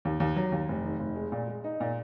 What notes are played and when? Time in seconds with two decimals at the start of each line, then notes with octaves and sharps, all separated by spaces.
0.05 D#2
0.20 D#2
0.36 F#3
0.52 D#2
0.69 F1
0.84 D#3
1.00 F1
1.16 G#3
1.32 A#2
1.48 G#3
1.64 D#4
1.80 A#2